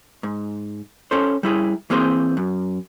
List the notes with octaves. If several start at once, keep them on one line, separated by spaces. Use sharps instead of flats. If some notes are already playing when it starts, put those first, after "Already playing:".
G#2
C#4 A4 C5
G3 E4 G#4
E3 A#3 C4 G#4 C5
F#2